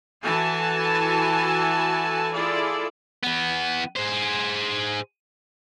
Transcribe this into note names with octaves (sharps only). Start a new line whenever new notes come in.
E3 E4 F#4 A4 G#5 A5
E4 F4 G#4 A4 D5
E3 B3
G#4 C5